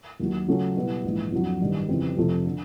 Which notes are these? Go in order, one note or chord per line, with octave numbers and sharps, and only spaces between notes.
D#2 D#3 F#3
C#3 F#3 A3 C#4 F4
B2 G3 B3 E4
A#1 G#2 E3
F2 D3 F#3
A1 G2 D#3 G3
F2 C#3 E3 G3 C4
F2 C3 F3 A3
D3